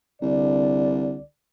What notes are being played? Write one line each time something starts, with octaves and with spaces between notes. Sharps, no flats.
C2 D3 D5